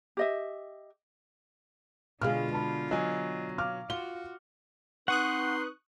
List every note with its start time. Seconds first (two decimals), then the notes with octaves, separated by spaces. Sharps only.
0.17 G4 D#5 E5
2.22 B2 D3 G#3 F4 G#4 F5 F6
2.52 A5 B5
2.91 F#3 D#5 G#5
3.58 F5 D6 F6
3.90 F4 F#4 G7
5.08 C4 D#4 B4 F#5 C6 C#6 D#6 F#6